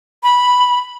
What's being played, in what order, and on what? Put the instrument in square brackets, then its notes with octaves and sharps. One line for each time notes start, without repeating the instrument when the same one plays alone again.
[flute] B5